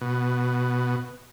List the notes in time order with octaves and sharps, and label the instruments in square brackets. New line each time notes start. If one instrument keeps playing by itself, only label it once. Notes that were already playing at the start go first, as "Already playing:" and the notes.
[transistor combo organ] B2